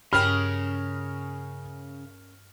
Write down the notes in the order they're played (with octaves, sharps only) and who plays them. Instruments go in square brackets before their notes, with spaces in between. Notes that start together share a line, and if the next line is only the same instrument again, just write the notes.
[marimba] G2 G5 [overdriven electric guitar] C#3 [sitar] C#4 A#4 [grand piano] F6